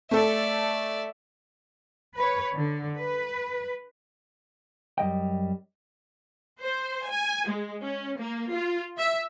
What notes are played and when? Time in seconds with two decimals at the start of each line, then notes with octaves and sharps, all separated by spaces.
0.11 A3 A4 D5 E5
2.16 B4 C#5
2.57 D3
2.98 B4
4.98 F#2 G3 D#5 G5
6.60 C5
7.08 G#5
7.48 G#3
7.82 C#4
8.18 A#3
8.50 F4
8.98 E5